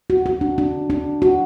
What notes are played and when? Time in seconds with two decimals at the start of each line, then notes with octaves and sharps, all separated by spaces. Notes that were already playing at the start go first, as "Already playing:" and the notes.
0.10 F#4
0.26 F#4
0.41 D4
0.58 D4
0.90 D4
1.22 F#4